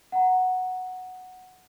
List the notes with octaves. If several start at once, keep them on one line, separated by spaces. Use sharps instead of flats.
F#5 A#5